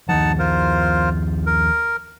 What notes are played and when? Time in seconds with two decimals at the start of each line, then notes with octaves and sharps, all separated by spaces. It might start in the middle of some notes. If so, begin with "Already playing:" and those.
0.09 D#2 D#3 F3 D#4 F#5 A5
0.39 F4 A#4 C5
1.46 A#4